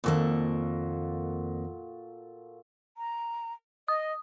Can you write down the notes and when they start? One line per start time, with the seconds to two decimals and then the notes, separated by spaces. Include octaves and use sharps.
0.04 F2 A#2 D#3 A#3 F#4 A4
2.97 A#5
3.88 D#5 D#6